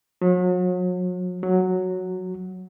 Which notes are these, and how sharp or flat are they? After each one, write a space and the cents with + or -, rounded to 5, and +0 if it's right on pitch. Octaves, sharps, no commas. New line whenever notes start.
F#3 -40
F#3 -5